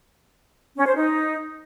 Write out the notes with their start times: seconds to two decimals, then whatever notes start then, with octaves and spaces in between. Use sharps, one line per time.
0.77 C#4
0.87 C5
0.96 D#4